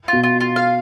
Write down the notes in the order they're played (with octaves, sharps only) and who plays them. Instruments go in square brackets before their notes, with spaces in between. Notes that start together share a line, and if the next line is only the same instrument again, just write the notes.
[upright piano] B2 [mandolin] F4
[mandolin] F4
F4
F5